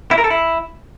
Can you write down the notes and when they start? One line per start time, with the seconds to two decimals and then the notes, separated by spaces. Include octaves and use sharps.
0.11 E4
0.18 A#4
0.24 A4
0.30 E4